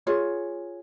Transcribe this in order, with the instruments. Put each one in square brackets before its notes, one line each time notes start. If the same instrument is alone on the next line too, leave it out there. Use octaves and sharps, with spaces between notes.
[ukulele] F4 G#4 C#5